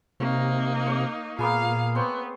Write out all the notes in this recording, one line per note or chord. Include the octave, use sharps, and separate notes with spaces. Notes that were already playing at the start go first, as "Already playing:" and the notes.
C3 A#3 D#4 C#5
C#5 D6
A#2 A#3 B3 G#4 F5
B3 C4 C5 C#5